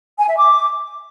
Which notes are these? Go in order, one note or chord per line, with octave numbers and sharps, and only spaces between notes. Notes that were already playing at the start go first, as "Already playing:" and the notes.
G#5
E5
D6